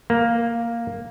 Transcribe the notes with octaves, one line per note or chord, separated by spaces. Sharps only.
A#3